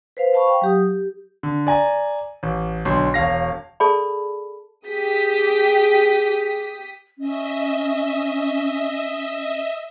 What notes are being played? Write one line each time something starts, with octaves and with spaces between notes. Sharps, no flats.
B4 C5 F5
C5 F5 A5 B5 C#6
F5 G5
F#3 G4 D#6
G4
D3
D5 G#5 A#5
A1
B1 D3 C6
E1 C#5 F5 A#6
G#4 A4 D5 A5 B5
G4 G#4 D#6 B6
C#4 D#5 E5